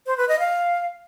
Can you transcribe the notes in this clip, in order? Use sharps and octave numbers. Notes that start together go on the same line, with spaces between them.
C5
B4
D#5
F5